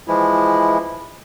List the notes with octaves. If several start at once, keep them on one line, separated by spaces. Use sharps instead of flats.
E3 F3 G#3 E4